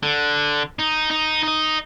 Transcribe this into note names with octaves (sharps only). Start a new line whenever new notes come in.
D3
D#4
D#4
D#4 D#5